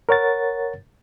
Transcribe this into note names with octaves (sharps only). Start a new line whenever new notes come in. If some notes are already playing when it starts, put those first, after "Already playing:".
A#4 C#5 F#5 A6